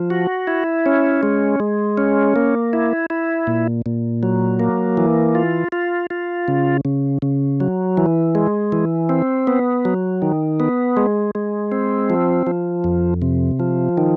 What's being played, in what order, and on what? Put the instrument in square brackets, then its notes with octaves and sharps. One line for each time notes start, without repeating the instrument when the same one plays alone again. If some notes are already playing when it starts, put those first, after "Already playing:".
Already playing: [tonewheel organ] F3
F#4
E4
C#4
G#3
G#3
C#4
A#3
E4
E4
A#2
A#2
F#3
A#3
E3
F4
F4
F4
C#3
C#3
C#3
F#3
E3
G#3
E3
C4
B3
F#3
D#3
B3
G#3
G#3
C4
F3
F3
F2
C3
F3
D#3